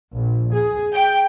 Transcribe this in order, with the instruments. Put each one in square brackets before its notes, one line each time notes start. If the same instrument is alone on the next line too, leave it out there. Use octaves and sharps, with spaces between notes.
[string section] A#1
G#4
G5